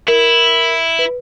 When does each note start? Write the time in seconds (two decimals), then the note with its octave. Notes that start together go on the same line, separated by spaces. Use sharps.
0.08 E4 A#4
0.99 B4